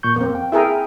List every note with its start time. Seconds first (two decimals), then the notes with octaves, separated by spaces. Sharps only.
0.03 A#2 C#6 G6
0.16 F2 A#3 C4
0.35 G5
0.52 E4 G#4 A#4 E5 G5